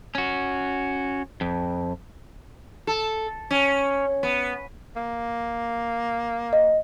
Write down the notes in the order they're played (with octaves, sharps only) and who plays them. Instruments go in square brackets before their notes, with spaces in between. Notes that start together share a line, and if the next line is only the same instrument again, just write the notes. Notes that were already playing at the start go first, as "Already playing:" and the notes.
[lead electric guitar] C#4 F#4
F2
[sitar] A4
C#4
B3
[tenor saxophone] A#3
[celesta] D#5